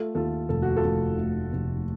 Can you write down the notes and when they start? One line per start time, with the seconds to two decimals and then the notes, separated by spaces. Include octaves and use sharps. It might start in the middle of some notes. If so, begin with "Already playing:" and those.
Already playing: A3 F4 A4
0.15 D#2 F4 A4
0.49 F1 A4
0.62 F#4
0.76 F4 A4
0.84 F1
1.19 A3
1.53 F1